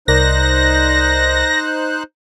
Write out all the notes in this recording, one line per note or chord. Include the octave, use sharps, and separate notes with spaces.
C2 D#4 A#4 C5 D5 F#6 A#6